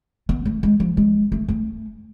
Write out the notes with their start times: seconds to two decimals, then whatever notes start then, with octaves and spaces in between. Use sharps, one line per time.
0.29 B3
0.45 A3
0.63 G#3
0.80 F3
0.97 G#3
1.32 A3
1.48 A3